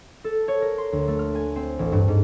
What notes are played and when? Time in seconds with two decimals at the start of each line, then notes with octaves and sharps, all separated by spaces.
0.24 A4
0.48 C#5
0.62 A#4
0.78 C6
0.93 D2
1.08 A3
1.19 F6
1.35 G#5
1.56 C4
1.79 A1
1.92 G2
2.08 G#2